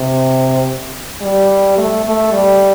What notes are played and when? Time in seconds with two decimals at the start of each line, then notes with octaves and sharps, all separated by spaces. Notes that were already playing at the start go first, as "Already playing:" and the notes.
Already playing: C3
1.21 G3
1.77 A3
2.05 A3
2.33 G3